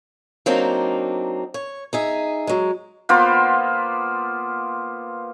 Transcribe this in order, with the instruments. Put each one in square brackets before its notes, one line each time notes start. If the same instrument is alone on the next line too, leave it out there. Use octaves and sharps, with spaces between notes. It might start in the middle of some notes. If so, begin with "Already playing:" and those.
[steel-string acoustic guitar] F#3 A#3 C4 D4 D#4
C#5
D#4 G#4 E5
F#3 G#3
[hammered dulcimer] A#3 B3 F4 C5